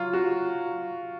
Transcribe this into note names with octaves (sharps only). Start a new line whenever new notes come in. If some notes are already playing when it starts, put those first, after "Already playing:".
Already playing: F#3 F4
F#4